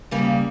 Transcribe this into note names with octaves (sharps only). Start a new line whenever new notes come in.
C#3 G3 A#3